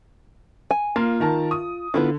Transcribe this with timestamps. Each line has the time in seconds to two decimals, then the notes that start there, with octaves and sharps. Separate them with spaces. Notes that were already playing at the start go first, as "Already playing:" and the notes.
0.71 G#5
0.96 A#3 F4
1.20 D#3 A#4 A5
1.51 D#6
1.94 D3 B3 E4 F4